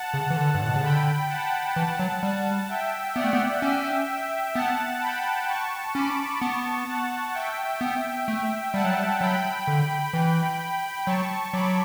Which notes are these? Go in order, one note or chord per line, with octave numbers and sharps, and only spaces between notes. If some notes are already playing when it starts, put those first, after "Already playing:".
Already playing: F#5 A5
C#3
E3
D3
G2
A2
B2
C#3
D3 G5 B5
F#5 A5
E3 F#5 A5
F#3
G3
E5 G5
B3 D5 F#5
A3
B3
C#4 E5 G5
B3 F#5 A5
G5 B5
A5 C#6
C#4 B5 D6
B3 A5 C#6
F#5 A5
E5 G5
B3
A3
G3 F#5 A5
F#3
G3
F#3 G5 B5
D3
E3
F#3 A5 C#6
F#3 B5 D6